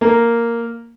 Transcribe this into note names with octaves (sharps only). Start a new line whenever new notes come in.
A#3